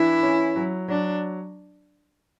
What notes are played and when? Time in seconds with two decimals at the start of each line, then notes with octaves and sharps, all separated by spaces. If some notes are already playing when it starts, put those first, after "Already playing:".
Already playing: E3 D4 E4
0.23 C#4
0.56 F#3
0.88 F#3 D4